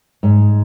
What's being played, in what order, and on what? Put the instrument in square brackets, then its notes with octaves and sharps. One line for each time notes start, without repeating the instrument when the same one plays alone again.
[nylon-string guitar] G#2